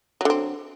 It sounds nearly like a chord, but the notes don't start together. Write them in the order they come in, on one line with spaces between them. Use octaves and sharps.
F#3 D3 C4